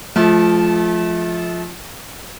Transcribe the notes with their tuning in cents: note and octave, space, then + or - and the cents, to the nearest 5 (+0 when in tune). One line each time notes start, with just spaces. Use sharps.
F3 +0 A3 -35